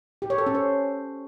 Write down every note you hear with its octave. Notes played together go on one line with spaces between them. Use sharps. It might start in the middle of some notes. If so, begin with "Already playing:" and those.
G4
C#5
A4
C#4
C5